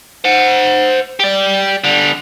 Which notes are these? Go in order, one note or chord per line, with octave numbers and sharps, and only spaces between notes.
C5 F#5
G4 D5
D3 G3